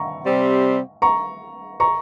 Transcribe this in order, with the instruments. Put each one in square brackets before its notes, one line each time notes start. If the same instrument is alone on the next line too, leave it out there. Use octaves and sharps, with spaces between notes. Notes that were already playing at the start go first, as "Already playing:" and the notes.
Already playing: [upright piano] A#5 C#6
[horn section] C3 G3 C4
[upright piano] A#5 C#6
A#5 C#6